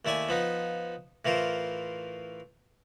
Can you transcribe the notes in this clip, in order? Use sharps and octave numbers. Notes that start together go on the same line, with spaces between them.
D#2 A3 E4 D5 G#5
F3 B3 D#4
A2 E3 F4 A#4 C5